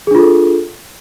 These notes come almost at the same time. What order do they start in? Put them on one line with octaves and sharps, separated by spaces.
G#4 D4 F4 A4